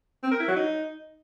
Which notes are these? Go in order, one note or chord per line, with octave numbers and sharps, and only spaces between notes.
C4
A#4
E4
F#3
D#4